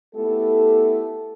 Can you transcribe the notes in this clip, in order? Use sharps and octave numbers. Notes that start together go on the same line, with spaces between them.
A3 B3 E4 G4 A4